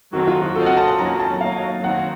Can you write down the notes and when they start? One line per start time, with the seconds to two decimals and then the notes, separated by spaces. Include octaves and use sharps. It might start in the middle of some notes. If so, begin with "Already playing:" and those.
0.13 D#3 F#3 C4 D#4 F#4 A4
0.27 F4
0.42 F#4
0.55 C4 F4 A4 C5 D#5
0.66 F#5
0.77 A5
0.88 A5
0.99 D#3 F#3 A#3 C#4 A#5
1.20 A5
1.41 F#3 A#3 D#4 F5
1.84 D#3 F#3 C4 F#5